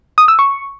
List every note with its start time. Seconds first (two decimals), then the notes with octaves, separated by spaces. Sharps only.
0.18 D#6
0.28 E6
0.39 C#6